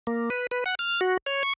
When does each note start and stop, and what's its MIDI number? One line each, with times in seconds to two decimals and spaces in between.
0.07 0.30 58
0.30 0.47 71
0.51 0.64 71
0.66 0.75 78
0.79 1.01 89
1.01 1.17 66
1.26 1.43 73
1.43 1.53 85